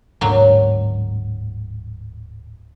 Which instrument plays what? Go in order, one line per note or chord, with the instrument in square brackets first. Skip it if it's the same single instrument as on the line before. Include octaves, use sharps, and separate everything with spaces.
[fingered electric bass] D1 G#2 D4 [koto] F#3 A#3